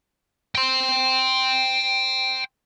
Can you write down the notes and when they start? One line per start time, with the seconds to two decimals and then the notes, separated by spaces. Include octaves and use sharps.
0.55 G5 C6